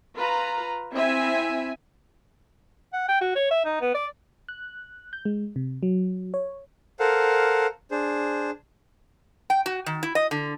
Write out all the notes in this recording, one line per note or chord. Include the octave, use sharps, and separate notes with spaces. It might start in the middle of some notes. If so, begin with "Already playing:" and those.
F4 B4 A#5
C4 E4 E5 G#5
F#5
G5
F#4
C#5
E5
D#4
B3
D5
F#6
G6
G#3
C3
F#3
C#5
A4 A#4 C5 F5 F#5
D4 G#4 C5
G5
F#4
D#3
E4
D#5
D3